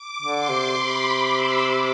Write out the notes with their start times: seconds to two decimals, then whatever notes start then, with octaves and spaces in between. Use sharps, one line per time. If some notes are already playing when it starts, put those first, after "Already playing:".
Already playing: D6
0.22 D3
0.36 C6
0.50 C3
0.78 C3 B5
1.07 C6
1.35 E6
1.63 D6